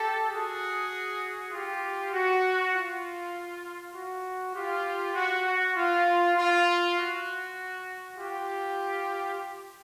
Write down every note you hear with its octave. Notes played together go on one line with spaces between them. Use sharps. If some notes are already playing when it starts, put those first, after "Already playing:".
Already playing: G4 A4
F#4 G#4
F4 G4
F#4
F4
F#4
F4 G4
F#4
F#4
F4
F4
F#4
F4 G4